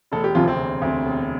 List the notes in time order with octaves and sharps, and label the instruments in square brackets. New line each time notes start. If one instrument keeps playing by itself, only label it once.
[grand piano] E1 [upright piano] A3 A4
[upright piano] G4
[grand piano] D2 C3 [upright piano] F3 F4
[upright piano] C4
[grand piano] E1
D2 C3
E1